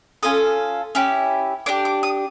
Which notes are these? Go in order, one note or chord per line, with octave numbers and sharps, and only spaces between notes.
C#4 F4 A4 D#6
C#4 E4 G4
D4 G4 D6
D6
D#6